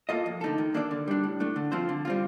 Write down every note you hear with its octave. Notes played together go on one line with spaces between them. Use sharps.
A#3 F4 A4 D#5
F2
D3 A3 D#4 A4
D#3
A#3 D4 A4 D5
D3
G3 D4
A2
A3 D4
D3
F3 C4 F4 C5
D3
G3 C4 F4